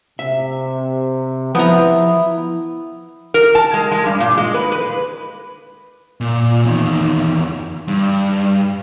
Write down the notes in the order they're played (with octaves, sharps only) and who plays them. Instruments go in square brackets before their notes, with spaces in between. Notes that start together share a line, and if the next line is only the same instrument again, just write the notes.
[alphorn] C3 [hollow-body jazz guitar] E5
[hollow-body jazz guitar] F3 [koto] B3 A#5 [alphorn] E4
[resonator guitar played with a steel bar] A#4
A5
G#3
G#3
G2
A#2
G#3
B4
B4
[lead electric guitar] A#2
E2 D#3
G2